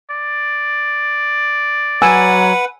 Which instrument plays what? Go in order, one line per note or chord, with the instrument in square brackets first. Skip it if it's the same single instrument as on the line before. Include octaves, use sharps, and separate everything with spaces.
[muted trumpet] D5
[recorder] F#3 [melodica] B4 F#5 [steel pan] G#5 E6